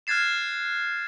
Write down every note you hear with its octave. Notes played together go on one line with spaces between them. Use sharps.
F6 F#6 G#6 A6 C7 E7